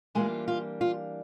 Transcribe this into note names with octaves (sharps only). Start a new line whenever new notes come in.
E3 G3 G#3 A#3 D4 F4 G#4
F4
F4